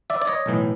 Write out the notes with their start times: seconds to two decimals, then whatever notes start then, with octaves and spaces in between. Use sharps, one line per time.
0.10 D5 E5
0.22 D5
0.27 C#5 D#5
0.46 B1 A2 E3